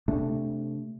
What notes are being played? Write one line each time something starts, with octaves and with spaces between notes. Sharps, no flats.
C3 A3 D4